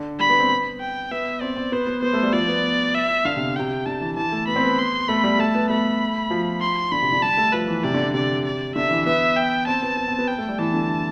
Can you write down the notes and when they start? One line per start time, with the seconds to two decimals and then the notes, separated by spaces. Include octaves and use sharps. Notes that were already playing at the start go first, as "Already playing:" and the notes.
Already playing: D3
0.19 G3 B5
0.29 B3
0.39 C4
0.49 B3
0.80 G5
1.11 B3 E5
1.41 C4 D5
1.56 C4
1.72 B3 C5
1.87 B3
2.02 B3 C5
2.13 A3
2.23 G3
2.33 F3 D5
2.48 B3
2.94 E5
3.25 D3 F5
3.37 C3
3.56 C3 G5
3.86 D3 A5
4.01 E3
4.16 E3 A5
4.32 A3
4.47 B3 B5
4.56 C4
4.63 B3
4.78 C6
5.08 A3 B5
5.24 G3
5.39 A3 A5
5.55 B3
5.70 A3 B5
6.31 F3
6.61 C6
6.92 D3 B5
7.02 C3
7.12 D3
7.22 G3 A5
7.37 A3
7.53 F3 B4
7.68 E3
7.84 C3 D5
7.94 D3
8.14 C3 D5
8.45 D5
8.75 D3 E5
8.91 E3
9.06 B3 E5
9.37 G5
9.67 C4 A5
9.83 B3
9.97 B3
10.08 C4
10.19 B3
10.28 G5
10.38 A3
10.49 G3
10.58 E3 A5
10.74 D3